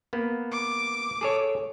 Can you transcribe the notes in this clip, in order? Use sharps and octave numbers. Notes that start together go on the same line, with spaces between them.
A#3 B3
D6
G#4 A4 C#5